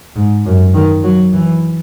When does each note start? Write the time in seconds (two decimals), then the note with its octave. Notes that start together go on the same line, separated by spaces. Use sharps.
0.16 G#2
0.46 F#2
0.74 D#3
1.03 F#3
1.33 E3